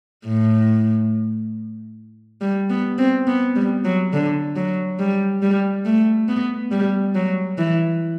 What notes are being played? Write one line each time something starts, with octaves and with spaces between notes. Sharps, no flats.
A2
G3
B3
C4
B3
G3
F#3
D3
F#3
G3
G3
A3
B3
G3
F#3
E3